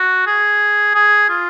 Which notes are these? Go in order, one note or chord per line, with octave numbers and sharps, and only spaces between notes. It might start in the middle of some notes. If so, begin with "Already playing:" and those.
Already playing: F#4
G#4
G#4
F4